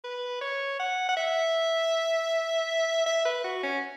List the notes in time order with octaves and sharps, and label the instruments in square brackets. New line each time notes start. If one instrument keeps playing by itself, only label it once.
[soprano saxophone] B4
C#5
F#5
F#5
E5
E5
B4
F#4
C#4